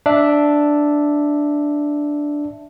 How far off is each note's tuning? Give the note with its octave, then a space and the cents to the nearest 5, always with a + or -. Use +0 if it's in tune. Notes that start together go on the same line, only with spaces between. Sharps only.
D4 +0 E5 +0